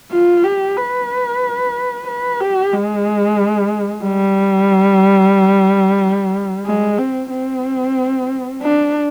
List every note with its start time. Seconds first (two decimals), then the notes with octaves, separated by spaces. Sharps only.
0.12 F4
0.44 G4
0.77 B4
2.07 B4
2.40 G4
2.73 G#3
4.03 G3
6.65 G#3
6.98 C4
7.31 C4
8.62 D4